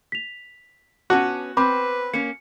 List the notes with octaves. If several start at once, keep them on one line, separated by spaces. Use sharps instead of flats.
B6 F7
B3 C#4 F#4 A5 D6
C4 B4 B5 D6
A#3 C#4 C#7